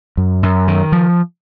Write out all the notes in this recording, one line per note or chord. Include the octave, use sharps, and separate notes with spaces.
F#2
F#2
D#3
F3